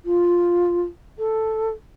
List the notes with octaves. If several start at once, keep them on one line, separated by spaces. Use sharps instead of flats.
F4
A4